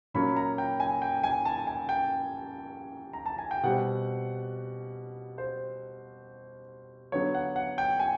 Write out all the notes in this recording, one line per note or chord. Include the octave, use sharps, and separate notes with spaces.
A#2 F#3 A#3 C#4 B5
A#5
G5
G#5
G5
G#5
A5
G#5
G5
A#5
A5
G#5
G5
B2 G3 C4 F#5
C5
D3 F#3 B3 C#5
F#5
F#5
G5
G#5